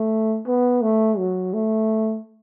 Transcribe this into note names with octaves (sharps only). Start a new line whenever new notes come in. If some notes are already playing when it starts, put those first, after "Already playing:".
Already playing: A3
B3
A3
F#3
A3